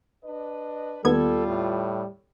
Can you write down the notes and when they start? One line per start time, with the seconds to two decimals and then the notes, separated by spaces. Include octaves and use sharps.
0.24 D4 B4 D#5
1.05 D#2 G3 B3 F4 A4 G#6
1.48 A2